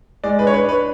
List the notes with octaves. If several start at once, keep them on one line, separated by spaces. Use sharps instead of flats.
G#3 D5
B4
D4 C#5
B4
D4 B4